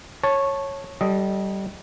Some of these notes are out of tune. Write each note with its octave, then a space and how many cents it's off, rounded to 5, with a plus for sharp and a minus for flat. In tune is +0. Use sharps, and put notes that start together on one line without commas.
C#5 -10 A5 -5
G3 -20 A4 -10 D#5 +0